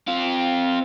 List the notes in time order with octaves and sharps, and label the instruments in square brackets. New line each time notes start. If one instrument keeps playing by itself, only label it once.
[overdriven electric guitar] C4 F4